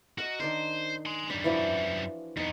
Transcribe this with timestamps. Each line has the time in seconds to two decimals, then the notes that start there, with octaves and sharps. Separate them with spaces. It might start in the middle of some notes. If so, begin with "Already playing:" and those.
0.18 F#4 A#4 D#5 C#6
0.40 D#3 D4 A#4 C5
1.06 G#5 C6
1.30 F#2 G3 D4
1.44 E3 F3 F#4
2.37 F2 B3 D#4